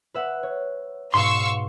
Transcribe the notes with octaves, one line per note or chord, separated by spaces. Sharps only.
B4 E5 F#5
C#5
G#2 B2 F5 C6 C#6 E6